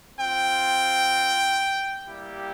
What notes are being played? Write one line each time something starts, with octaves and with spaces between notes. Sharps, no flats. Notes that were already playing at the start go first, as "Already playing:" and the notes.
C4 F4 G5
G3 A#3 E4 G4